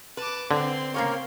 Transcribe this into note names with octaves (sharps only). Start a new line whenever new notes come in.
B4 A5 D6
D3 C4 C6
C#3 A#3 A#4 C#5